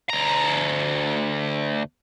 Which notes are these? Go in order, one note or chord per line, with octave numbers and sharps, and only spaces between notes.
D2 A#5